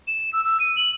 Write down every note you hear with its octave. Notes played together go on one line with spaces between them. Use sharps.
E7
E6
E6
D#7
F#7